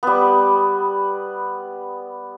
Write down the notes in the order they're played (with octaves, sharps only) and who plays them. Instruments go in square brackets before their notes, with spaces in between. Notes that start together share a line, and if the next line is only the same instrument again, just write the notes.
[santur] G3 B3